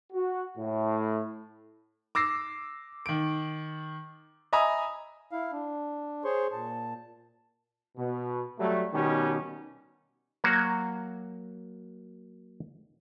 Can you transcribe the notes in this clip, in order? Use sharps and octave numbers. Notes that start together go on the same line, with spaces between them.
F#4
A2
D6 E6 A#6 C7
D#3 D7
D#5 E5 G#5 A#5 B5 D#6
E4 F5
D4
G#4 C5 C#5 C6 C#6
A#2 A5
B2
F#3 G3 A3
B2 D#3 G3 C#4 G4
F#3 A#3 F#4